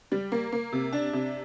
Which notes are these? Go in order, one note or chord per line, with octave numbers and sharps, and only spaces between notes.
G3
A#3
A#3
C3
D4
C3